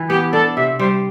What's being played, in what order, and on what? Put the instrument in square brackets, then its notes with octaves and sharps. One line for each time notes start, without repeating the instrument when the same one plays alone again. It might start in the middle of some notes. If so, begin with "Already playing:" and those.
Already playing: [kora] E3
[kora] B3 [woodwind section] G4
[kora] D4 [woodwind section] A4
[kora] C3 [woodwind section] E5
[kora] G3 [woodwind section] C5